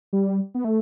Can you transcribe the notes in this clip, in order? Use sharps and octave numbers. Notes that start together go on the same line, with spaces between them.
G3
B3
A3